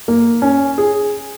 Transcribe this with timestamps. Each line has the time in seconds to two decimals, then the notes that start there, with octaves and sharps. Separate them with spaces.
0.08 A#3
0.42 C#4
0.78 G#4